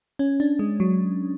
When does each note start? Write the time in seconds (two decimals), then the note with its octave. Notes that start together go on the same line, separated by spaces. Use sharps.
0.19 C#4
0.40 D4
0.59 G#3
0.80 F#3